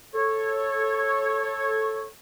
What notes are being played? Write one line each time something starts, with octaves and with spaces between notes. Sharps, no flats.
A4 C#5